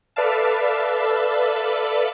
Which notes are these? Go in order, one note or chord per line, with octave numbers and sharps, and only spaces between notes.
A4 B4 D5 E5 F5 A5